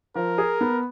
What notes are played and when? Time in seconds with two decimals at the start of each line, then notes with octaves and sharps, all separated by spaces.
0.15 F3 A#4
0.38 G#4
0.61 B3